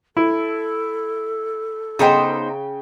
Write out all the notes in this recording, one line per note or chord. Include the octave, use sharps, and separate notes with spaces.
E4 A4
C#3 B3 D#4 C5 G5